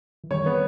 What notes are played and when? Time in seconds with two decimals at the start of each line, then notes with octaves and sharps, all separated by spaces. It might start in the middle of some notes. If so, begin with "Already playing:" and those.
0.24 E3
0.31 D#3 G3 C#5
0.46 B3